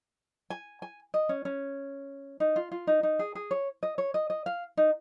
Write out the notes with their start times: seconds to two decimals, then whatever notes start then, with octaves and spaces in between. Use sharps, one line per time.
0.50 G#5
0.82 G#5
1.14 D#5
1.29 C#4
1.45 C#4
2.40 D#4
2.56 F4
2.72 F4
2.87 D#4
3.03 D#4
3.19 G#4
3.35 G#4
3.51 C#5
3.83 D#5
3.98 C#5
4.14 D#5
4.30 D#5
4.46 F5
4.77 D#4